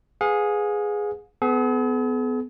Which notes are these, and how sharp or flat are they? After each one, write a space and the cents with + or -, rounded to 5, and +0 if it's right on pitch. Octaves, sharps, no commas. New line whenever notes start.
G#4 +0 B4 +10 F5 +45
B3 +25 G#4 +45